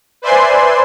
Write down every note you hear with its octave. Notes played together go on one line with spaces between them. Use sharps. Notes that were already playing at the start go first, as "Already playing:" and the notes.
B4 C5 D5 E5 G#5 C6